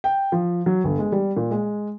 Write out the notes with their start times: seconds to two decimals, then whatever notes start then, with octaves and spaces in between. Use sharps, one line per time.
0.04 G5
0.32 F3
0.66 F#3
0.84 G1
0.99 G#3
1.12 G3
1.37 A#2
1.51 G#3